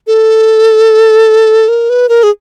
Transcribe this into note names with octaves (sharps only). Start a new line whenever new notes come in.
A4
A#4
B4
A#4
G#4